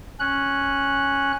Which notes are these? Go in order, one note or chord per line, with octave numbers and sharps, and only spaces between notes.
C#4 F#6